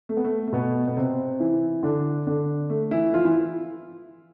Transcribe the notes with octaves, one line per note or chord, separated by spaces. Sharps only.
A3
B3
A3
A3
B2 B3
B3
C3 C4
E3 E4
D3 D4
D3 D4
A3
E3 E4
F3 F4
E3 E4